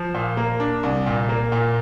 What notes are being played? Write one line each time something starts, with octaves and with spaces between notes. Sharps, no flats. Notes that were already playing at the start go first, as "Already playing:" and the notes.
Already playing: F3
A#2
A#3
D4
C2
A#2
A#3
A#2